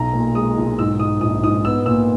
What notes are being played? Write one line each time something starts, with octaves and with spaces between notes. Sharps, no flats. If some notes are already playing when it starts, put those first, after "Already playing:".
Already playing: B1 A#5
A#2
G#3 D#6
B1
G#2 E6
G#2 D#6
A#1 D#6
G#2 D#6
B3 E6
A#2 E6